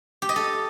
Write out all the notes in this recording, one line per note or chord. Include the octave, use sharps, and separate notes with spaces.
G4
D#5
A4